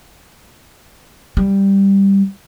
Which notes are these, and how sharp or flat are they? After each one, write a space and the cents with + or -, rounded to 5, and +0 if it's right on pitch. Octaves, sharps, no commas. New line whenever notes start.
G3 +5